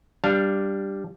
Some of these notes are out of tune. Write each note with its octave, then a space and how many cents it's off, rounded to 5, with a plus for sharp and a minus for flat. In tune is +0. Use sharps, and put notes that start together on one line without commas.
G3 +0 D4 +0 F5 +0